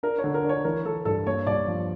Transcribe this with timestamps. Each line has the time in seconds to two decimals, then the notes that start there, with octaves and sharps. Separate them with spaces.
0.03 D4 A#4
0.18 C#5
0.24 D3
0.34 A#4
0.44 D4
0.49 C#5
0.64 E3 A#4
0.85 E3 A4
1.05 G2 A4
1.26 A#3 C#5
1.47 G2 D5
1.68 F3